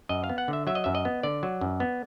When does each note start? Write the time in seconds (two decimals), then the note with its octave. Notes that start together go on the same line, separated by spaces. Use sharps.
0.09 F#2 D#5
0.24 F5
0.29 B3
0.38 F#5
0.48 D3 E5
0.67 F#3 E5
0.75 D#5
0.84 F#2 E5
0.95 D#5
1.05 B3
1.23 D3 D5
1.43 F#3
1.61 F#2
1.80 B3